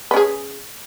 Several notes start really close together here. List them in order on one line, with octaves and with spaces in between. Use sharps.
B4 C#4 G#4